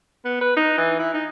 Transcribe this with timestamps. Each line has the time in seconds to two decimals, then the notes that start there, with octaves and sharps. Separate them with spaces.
0.25 B3
0.41 B4
0.56 D#4
0.78 E3
0.99 E4
1.14 D#4